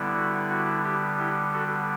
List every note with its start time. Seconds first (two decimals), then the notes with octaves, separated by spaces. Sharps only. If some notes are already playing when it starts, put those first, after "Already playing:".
Already playing: D3 G3 B3 E4
0.15 F#4
0.50 F#4
0.84 E4 G4
1.19 E4 G4
1.54 F#4 A4